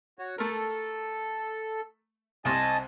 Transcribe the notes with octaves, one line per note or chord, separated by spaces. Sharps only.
F#4 C#5
A3 A4 A#4
C2 C3 D#5 G#5 A5